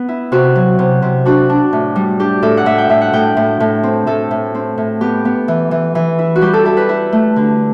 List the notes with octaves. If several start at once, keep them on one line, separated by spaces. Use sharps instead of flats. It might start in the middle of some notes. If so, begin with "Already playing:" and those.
Already playing: B3
E4
C3 F#4
F#3
C3
C3
D4 F#4
D4
A2
G3
D4 G4
A2 A4
F#5
A2 E5
G5
A2 E5
F#5
A2 G5
A2
A2
C4
A2 A4
A2
C4
A2
B3 G4
B3
E3
E3
E3
E4
F#4
G3 G4
A4
E4 A4
B4
E4
A3
D3